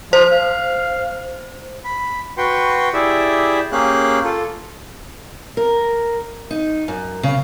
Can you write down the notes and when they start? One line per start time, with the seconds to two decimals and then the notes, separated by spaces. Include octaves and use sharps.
0.13 F3 C5
0.32 F5
1.85 B5
2.38 F#4 B4 G5 C6 C#6
2.94 E4 G4 G#4 D5 E5
3.72 A#3 C#4 G4 G#4 F5 F#6
4.24 F4 A4
5.57 A#4
6.51 D#4
6.88 F#2
7.23 C#3